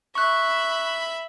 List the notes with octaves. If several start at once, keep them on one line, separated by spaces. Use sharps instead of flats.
E5 B5 C#6 F#6